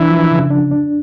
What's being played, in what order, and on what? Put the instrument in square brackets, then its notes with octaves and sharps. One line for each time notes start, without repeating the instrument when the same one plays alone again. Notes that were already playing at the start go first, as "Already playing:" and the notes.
Already playing: [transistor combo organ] E3 [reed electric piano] D4
[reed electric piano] F3
C#3
D4
D4